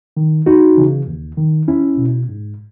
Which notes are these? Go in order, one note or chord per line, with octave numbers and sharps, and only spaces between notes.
D#3
E2 D#4 F#4
C#3 E3
D#2
D#3
E2 C#4 E4
B2
G#2